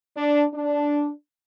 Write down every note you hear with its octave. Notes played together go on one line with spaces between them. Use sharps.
D4
D4